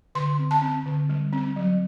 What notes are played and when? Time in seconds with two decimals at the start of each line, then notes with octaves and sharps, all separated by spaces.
0.15 D3 C6
0.39 C4
0.51 A5
0.62 C4
0.86 D3
1.09 G3
1.33 C4
1.56 F#3